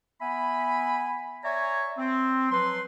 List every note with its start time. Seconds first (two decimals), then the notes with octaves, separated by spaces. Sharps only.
0.22 B3 E5 G#5 B5
1.44 C#5 D5 E5 G#5 A#5 C#6
1.98 C4
2.51 F3 F#3 B4 C6